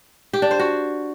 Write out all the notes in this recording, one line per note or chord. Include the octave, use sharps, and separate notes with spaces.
G4
D4
C5
F#4